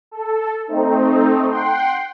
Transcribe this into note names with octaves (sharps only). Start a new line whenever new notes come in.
A4
A3 C4 D#4
F#5 G5 C6